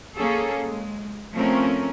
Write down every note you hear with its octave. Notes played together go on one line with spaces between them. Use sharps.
A#3 C#4 G#4 A4
G#3
F3 A3 C4 C#4 A#4